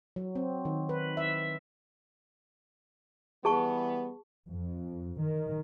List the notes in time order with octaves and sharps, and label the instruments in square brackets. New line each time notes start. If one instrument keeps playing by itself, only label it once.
[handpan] F#3
C4
D#3
B4
E5
[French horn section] E3 G3 B3 [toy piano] G#4 A5 C#6
[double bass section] F2
D#3